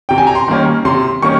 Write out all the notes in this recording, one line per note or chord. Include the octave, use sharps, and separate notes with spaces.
C3 G5
G#5
A#5
C6
D#3 G3 A#3 C#4
C3 C6
D#3 G3 A#3 C#4 C#6